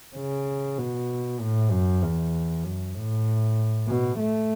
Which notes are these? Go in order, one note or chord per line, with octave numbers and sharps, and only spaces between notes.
C#3
B2
A2
F#2
E2
F#2
A2
B2
A3